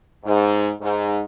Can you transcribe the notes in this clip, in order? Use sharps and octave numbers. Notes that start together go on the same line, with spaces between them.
G#2
G#2